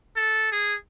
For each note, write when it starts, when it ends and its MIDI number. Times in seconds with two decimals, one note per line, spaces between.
0.16 0.52 69
0.52 0.74 68